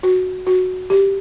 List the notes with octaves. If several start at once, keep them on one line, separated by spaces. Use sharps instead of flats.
F#4
F#4
G4